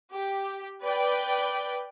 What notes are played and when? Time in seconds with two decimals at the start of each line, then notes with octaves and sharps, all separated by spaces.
0.13 G4
0.82 B4 D5 G5